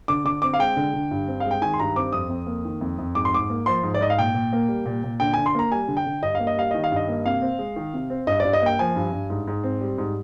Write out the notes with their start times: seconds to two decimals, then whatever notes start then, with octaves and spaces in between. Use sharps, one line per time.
0.08 D3 D6
0.25 D3 D6
0.42 C4 D6
0.54 F5
0.59 G#3 G5
0.77 D3
0.94 D3
1.11 G2
1.28 C4
1.40 G#3 F5
1.51 G5
1.62 D#3 G#5
1.74 C6
1.79 G2 A#5
1.96 C4 D6
2.13 F2 D#6
2.30 F2
2.47 A#3
2.65 D#3
2.81 F2
2.98 F2
3.15 G#2 D6
3.25 C6
3.33 G#2 D6
3.50 A#3
3.66 F3 C6
3.83 G#2
3.94 D5
4.01 G#2 D#5
4.10 F5
4.18 A#2 G5
4.35 A#2
4.53 A#3
4.69 G3
4.86 A#2
5.04 A#2
5.20 D3 G5
5.34 D3 G#5
5.46 C6
5.55 A#3 A#5
5.72 G3 G#5
5.88 D3
5.97 G5
6.06 D3
6.22 G2 D#5
6.35 A#3 F5
6.47 D#5
6.57 G3 F5
6.71 D#3 D#5
6.84 F5
6.92 G2 D#5
7.08 A#3
7.26 C3 F5
7.42 C4
7.59 G#3
7.76 D#3
7.94 C3
8.10 C4
8.27 G2 D#5
8.40 G2 D5
8.53 D#5
8.62 A#3 G5
8.79 F3 G#5
8.96 G2
9.12 G2
9.30 G#2
9.47 G#2
9.64 C4
9.81 G3
9.98 G#2